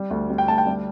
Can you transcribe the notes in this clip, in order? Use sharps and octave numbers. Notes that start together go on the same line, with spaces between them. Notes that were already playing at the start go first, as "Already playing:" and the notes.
Already playing: G3
D2
G3
G5
D2 A5
G5
G3